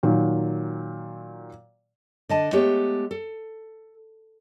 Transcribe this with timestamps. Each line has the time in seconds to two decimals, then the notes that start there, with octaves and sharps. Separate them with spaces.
0.03 A#2 D#3 F#3
2.29 D3 D#5 A5
2.52 G#3 A3 B3 G4 C#5
3.11 A4